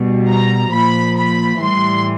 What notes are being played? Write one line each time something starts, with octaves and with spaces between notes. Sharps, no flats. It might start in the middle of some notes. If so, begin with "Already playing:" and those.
Already playing: B2 G3
A#5
A#2 F3 B5
B5
A2 E3 G3 C6